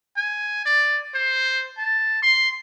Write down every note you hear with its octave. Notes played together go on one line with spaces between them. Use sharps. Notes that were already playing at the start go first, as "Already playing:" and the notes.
G#5
D5
C5
A5
C6